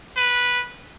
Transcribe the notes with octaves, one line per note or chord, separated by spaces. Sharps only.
B4